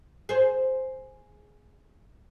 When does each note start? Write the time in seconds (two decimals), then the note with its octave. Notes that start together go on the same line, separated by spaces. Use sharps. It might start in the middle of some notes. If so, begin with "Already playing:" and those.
0.29 G#4 C5